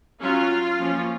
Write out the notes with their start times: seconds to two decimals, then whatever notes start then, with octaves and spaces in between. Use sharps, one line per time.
0.21 F#3 C#4 F4
0.80 F3 A#3 C#4